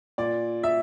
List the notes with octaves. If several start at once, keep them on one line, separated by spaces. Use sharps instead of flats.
A#2 D5
E5